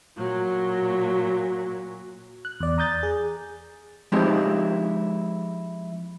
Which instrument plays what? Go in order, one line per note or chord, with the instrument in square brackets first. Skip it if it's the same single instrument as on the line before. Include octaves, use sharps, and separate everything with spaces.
[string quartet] A#2 F#3
[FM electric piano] F#6
E2 D5
A#5 D#6 G6 A6
G#4
[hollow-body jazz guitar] F3 G#3 C4 D#4 E4 G4